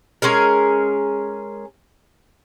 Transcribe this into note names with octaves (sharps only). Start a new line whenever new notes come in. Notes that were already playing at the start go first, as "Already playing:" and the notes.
G#3 C#4 G#4 A#4